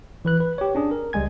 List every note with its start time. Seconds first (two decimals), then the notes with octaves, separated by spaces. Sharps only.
0.25 E3 B4 F#6
0.40 B4
0.58 G4 C#5
0.75 C#4 D4 G#4
0.91 A#4
1.13 C#2 G3 G#3 G#5 G#6